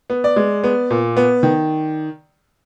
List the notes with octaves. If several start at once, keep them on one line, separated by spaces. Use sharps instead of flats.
B3
D5
G#3
B3
A#2
B3
D#3